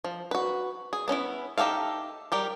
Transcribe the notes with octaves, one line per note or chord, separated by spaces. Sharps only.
F3
F#4 B4
G#4
B3 C#4 D#4 E4
D#4 G4 A4 E5 F5
G3 G4 A#4